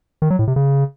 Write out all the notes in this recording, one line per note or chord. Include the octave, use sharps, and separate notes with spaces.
D#3
F#3
A2
C3
C#3